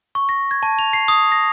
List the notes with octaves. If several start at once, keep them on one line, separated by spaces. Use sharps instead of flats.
C#6
A#6
G#6
A5
F7
C7
D#6
A#6